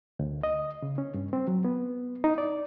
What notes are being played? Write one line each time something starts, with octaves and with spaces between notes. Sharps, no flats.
D2
D#5
C#3
C#4
G2
C4
F#3
B3
D#4
D5